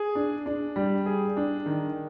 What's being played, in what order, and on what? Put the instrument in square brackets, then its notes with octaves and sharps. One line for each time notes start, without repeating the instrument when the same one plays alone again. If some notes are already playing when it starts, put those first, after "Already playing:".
Already playing: [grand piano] G#4
D4
D4
G3
G#4
D4
D#3